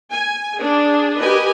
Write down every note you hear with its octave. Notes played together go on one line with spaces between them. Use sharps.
G#5
D4 G#4
G4 A#4 B4 D#5 G#5